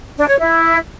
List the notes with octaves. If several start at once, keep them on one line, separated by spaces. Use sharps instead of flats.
D4
C#5
E4